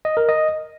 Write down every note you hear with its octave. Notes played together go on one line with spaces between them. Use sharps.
D#5
A#4
D#5